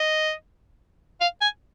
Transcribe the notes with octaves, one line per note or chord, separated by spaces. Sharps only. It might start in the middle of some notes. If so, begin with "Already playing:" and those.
Already playing: D#5
F5
G#5